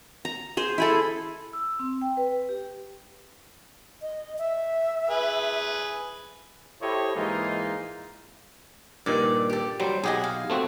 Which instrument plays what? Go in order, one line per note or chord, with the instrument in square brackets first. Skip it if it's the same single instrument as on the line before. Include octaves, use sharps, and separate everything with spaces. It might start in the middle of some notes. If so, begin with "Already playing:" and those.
[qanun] A#5
G#4 C5
E4 G#4 A4
[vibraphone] E6
C4
G5
B4
G4
[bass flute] D#5
E5
[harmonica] G#4 B4
[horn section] E4 G4 A4 C5 C#5 D#5
G#2 E3 G#3 A#3 D#4 F4
[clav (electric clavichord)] G2 A#2 D#3 [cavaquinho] D5
[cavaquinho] G4 A4
[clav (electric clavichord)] F#3 G3 [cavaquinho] C5
[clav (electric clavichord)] B1 G4 D#5 [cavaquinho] G#4 F#5 G#5
[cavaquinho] F5
[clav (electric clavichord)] A3 C4 F#4